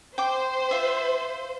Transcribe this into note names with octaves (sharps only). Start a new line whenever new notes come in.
C5 G5 D6
F4 E5